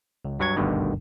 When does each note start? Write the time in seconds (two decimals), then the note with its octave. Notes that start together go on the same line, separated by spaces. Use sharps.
0.25 C#2
0.40 G2 F#3 C#6 G#6
0.56 G#1 D2 G2 B2 D3 D#3